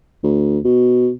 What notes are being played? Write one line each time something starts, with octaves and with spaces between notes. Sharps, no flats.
D2
B2